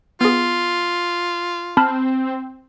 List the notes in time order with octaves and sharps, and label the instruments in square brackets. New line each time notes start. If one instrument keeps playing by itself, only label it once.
[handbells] B3 G#4 [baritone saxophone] F4
[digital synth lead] C4 [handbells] A5 B5 F6